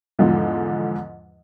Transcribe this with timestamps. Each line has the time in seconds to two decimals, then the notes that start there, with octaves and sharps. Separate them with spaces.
0.19 E2 G#2 D3 F3